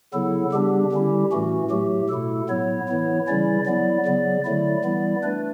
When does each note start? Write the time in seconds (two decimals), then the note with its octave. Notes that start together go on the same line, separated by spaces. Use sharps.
0.14 C#3 F#3 B3 E4 A4
0.52 C#3 G3 B3 D4 G4
0.92 D3 G3 C#4 E4
1.31 A2 E3 A3 C#4 F#4
1.70 A2 F#3 A3 G4
2.09 B2 A3 E4 A4
2.49 A2 F#3 B3 E4 C#5
2.88 E3 B3 E4
3.27 C#3 E3 G3 C#4 E4 D5
3.66 F#3 B3 E4 D5
4.06 C#3 F#3 B3
4.45 D3 F#3 A3 E4 D5
4.84 E3 G3 B3 E4
5.23 A3 D4 B4